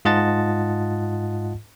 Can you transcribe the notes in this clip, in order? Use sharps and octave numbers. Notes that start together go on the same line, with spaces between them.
G#2 F4 D#5 F#5 A5 A6